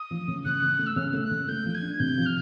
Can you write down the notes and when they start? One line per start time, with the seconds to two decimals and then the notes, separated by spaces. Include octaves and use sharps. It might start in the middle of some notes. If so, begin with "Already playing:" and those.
Already playing: D#6
0.11 F3
0.28 C#3
0.45 C#3 F#6
0.63 C#3
0.79 A3
0.86 E6
0.96 C#3 F6
1.13 A3
1.22 F#6
1.31 C#3
1.48 A3 G6
1.65 F3
1.74 G#6
1.82 D4
1.99 C3 G6
2.17 F3
2.26 F6